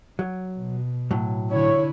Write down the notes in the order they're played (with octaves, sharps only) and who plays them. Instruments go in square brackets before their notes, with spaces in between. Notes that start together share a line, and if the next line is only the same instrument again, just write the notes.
[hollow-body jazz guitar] F#3
[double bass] B2
[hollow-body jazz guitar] A2 F#3
[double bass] D3 E4 [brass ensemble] C#5